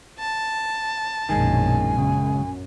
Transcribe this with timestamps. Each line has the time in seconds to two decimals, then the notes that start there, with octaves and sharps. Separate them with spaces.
0.19 A5
1.29 A#1 F#2 B2 D#3 G#3 G#5
1.97 C#2 F#2 C#3